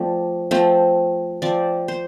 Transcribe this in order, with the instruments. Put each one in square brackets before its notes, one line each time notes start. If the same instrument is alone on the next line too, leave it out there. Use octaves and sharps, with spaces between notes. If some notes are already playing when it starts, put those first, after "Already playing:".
Already playing: [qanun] F3 A3 C4 D5
F3 A3 C4
F3 C4 D5
C5